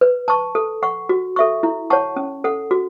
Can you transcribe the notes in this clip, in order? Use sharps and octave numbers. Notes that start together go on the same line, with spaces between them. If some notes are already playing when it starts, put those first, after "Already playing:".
B4
A5 C#6
A4
F#5 C#6
F#4
A4 E5 C#6
E4
C#5 F#5 A5 C#6
C#4
A4 F#5
F#4